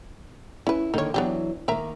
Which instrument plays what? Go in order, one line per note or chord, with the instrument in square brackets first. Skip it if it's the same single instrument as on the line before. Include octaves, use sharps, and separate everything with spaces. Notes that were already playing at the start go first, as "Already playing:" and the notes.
[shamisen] C#4 B4 [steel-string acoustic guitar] E4
[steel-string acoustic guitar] D3 D#3 A#3 [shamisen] D#4 C#5
[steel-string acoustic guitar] E3 F#3 [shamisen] B3 D4 G4
[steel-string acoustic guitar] D#3 A#3 [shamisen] A#4 E5 A#5